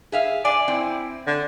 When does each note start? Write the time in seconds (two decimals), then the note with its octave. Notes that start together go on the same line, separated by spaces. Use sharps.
0.12 G#4 E5 F5
0.45 D5 G#5
0.68 C4 E4
1.27 D3